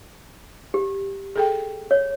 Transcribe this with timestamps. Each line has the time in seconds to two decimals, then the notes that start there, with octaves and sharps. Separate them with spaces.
0.74 G4
1.36 G#4 A4 G5
1.91 C#5